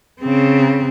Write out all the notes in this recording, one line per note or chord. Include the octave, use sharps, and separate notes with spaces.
C#3 C4